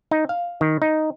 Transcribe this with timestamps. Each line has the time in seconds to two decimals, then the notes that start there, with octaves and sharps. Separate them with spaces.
0.11 D#4
0.29 F5
0.61 D#3
0.82 D#4